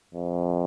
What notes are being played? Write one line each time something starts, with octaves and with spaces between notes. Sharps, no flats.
F2